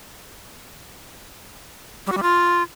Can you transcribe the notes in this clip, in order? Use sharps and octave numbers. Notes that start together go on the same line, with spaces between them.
G3
F#4
G3
F4